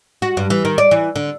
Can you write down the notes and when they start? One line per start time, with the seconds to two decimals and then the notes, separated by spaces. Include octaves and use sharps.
0.22 F#4
0.37 G2
0.50 E3
0.65 D#3
0.78 D5
0.91 E3
1.16 D3